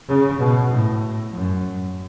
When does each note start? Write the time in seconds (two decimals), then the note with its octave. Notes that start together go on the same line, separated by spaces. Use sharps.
0.08 C#3
0.39 B2
0.71 A2
1.32 F#2